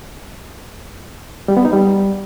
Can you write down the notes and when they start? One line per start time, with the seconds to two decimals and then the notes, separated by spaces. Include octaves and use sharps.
1.48 G3
1.57 B3
1.65 D#4
1.73 G3